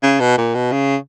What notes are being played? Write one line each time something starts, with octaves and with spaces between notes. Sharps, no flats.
C#3
B2
A#2
B2
C#3